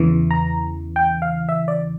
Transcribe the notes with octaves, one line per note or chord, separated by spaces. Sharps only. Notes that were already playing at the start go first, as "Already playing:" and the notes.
Already playing: E2 C#3 E3
A#5
G5
F5
E5
D5